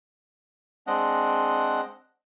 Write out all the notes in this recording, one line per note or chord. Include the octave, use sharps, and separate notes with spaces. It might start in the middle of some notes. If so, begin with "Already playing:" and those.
G#3 C4 D4 D#5 F#5